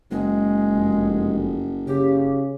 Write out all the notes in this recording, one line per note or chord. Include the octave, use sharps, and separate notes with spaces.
F#1 G#3
F1
C#3 G4